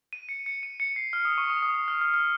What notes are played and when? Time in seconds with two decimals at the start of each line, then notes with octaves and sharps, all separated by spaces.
0.13 D#7
0.29 C#7
0.46 C#7
0.63 D#7
0.80 C#7
0.96 C7
1.13 F6
1.25 D#6
1.38 C#6
1.50 D#6
1.63 D#6
1.75 D#6
1.88 F6
2.01 F6
2.14 F6